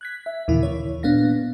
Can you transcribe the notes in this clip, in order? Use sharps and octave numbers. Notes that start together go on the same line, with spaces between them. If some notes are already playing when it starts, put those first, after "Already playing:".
F#6 G#6 B6
E5
D#2 A#2 C#3 E3 E4
C#5
A#2 B3 D4 F5 A#6